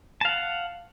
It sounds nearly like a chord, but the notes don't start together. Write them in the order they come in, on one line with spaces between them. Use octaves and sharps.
A5 F5 F#5